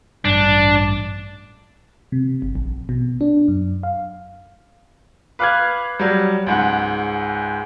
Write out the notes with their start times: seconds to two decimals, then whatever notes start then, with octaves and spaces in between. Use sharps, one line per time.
0.25 A1 G2 D4
2.12 C3
2.42 G1
2.55 A#1
2.89 B2
3.21 D4
3.48 F#2
3.83 F5
5.39 B4 F5 D6 F6 F#6 G#6
5.99 F#3 G3
6.47 C#2 G#2 F#5